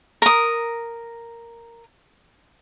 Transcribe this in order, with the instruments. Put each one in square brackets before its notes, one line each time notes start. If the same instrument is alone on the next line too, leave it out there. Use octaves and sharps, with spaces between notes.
[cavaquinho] A#4 D#6